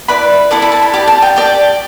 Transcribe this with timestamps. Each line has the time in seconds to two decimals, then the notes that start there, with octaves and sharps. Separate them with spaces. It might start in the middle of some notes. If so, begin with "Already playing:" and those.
0.08 E4 B4 D5 B5
0.51 E4 A4 D5 D6
0.62 B5
0.72 A5
0.83 B5
0.93 G4 D5 D6
1.08 A5
1.22 G5
1.36 G4 D5 G5